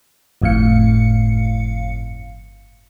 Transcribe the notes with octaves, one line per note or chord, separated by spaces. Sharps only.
G1 F2 A2 F5 C#7